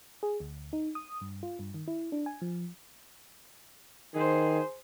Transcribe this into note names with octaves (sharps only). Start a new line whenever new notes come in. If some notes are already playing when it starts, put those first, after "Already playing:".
G#4
D2
D#4
D#6
G2
F4
G2
D#3
E4
D4
G#5
F3
D#3 G#4 C5